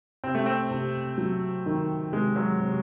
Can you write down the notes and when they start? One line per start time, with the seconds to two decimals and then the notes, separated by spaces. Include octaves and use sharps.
0.24 C3 C4
0.35 A3
0.46 C4
0.70 C3
1.18 F#3
1.66 D#3
2.12 C3 G#3
2.36 F#3
2.60 C3